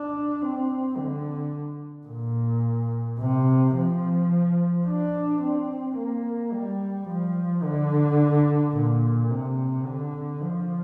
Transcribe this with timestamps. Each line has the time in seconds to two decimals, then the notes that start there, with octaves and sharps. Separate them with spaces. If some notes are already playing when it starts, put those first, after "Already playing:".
Already playing: D4
0.42 C4
0.97 D3
2.07 A#2
3.19 C3
3.75 F3
4.86 D4
5.41 C4
5.96 A#3
6.52 G3
7.08 F3
7.63 D3
8.74 A#2
9.30 C3
9.85 D3
10.41 F3